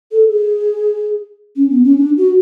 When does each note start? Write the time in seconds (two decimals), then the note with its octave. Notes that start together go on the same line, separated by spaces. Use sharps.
0.12 A4
0.30 G#4
1.56 C#4
1.70 B3
1.84 C#4
1.97 D4
2.17 F#4